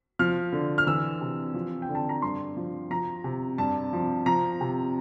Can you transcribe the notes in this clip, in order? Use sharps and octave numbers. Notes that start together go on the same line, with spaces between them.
F3 F6
D3
F6
E3 E6
C3
F3
G5
D3
A5
A#5
G2 C6
F3
F3 A#5
C3
G2 A5
F3
F3 A#5
C3